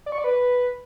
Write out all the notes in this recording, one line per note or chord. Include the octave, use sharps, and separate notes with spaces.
D5
C#6
D5
B4